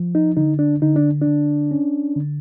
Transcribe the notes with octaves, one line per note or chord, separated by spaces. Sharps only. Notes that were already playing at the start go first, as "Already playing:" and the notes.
Already playing: F3
D#4
D3 D#4
D4
D3 D#4
D4
D4
D3
C#4
D3